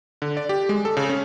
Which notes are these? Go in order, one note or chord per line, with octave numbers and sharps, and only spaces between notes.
D3
D5
G4
G#3
A4
C#3
C#4